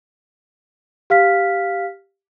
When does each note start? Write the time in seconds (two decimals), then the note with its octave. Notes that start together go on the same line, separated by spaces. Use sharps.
1.10 G4 F5 F6 B6